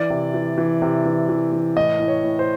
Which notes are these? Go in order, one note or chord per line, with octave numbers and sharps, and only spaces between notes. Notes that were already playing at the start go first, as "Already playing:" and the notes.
Already playing: E3 D5
C3
E3
E3
C3
E3
E3
E3
A2 D#5
A2
C#5
A2
C5